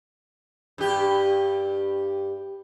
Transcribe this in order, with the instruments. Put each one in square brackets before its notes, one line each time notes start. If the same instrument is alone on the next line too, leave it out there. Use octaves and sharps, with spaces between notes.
[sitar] G2 G4